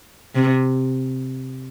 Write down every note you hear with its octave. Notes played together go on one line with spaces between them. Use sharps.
C3